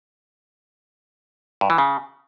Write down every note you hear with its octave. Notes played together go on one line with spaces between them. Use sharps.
G2
E3
C#3